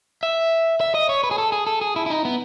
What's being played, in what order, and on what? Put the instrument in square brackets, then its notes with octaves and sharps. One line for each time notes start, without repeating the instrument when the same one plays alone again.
[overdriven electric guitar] E5
E5
D#5
C#5
B4
G#4
A4
G#4
A4
G#4
E4
E4
D#4
B3